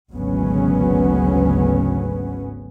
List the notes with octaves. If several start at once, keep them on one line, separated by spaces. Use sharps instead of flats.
G#1 D2 C#3 F#3 B3 C#4